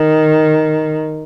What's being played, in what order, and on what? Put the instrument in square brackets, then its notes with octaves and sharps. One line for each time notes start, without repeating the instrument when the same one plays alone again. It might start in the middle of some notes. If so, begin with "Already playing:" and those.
Already playing: [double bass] D#3